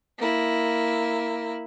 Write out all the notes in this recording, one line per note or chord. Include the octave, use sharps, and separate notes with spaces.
A#3 E4